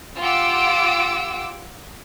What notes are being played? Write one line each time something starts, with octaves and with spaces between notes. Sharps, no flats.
F4 G4 F#5 D6 E6 D7